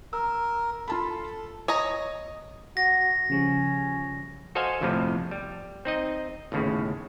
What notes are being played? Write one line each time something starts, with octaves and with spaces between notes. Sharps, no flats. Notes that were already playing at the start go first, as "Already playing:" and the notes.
A#4 E6
F4 A4 A5 B5
C#5 D#5 A#5
F#4 A#6
C#3 F3 G3 C#4
F#4 A4 C5 D#5 F5 G#5
G1 F2 A2 C3 F3
G3
C4 D#4 D#5
G1 D#2 A2 C#3